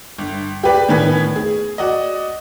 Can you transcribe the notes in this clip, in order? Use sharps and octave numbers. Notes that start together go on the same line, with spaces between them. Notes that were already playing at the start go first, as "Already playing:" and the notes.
G1
G4 G#4 B4 D5
A2 D#3 B3 B4 G#5 G#6
G#4
F#4 D5 D#5